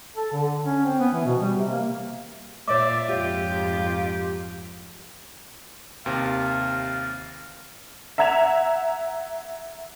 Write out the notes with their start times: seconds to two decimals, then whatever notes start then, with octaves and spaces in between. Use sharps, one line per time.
0.16 A4
0.32 D3
0.64 C#4
0.85 C4
1.00 B3
1.13 E3
1.26 B2
1.41 G3
1.58 C3
1.71 A#3
2.68 A#2 F4 C#5 D5 E5 D6
3.08 F2 G#2 F4 G4
6.06 D#2 C3 F5
8.18 E5 F#5 A#5 G#6 E7 F7